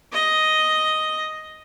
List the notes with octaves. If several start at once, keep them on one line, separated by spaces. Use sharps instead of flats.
D#5